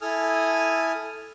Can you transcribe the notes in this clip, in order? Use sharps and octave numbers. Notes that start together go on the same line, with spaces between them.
E4 A4 G#5 D#6 F6